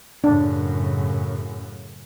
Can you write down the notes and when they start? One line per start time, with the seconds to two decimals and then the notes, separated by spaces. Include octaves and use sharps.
0.24 F#2 A2 C#3 D4